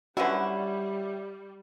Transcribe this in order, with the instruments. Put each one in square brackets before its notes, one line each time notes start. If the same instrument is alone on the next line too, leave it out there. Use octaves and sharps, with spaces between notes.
[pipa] D3 C#4 E4 [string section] G3 [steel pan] F#4 B4